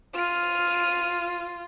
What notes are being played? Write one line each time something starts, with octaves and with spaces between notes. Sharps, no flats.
F4 F6 D#7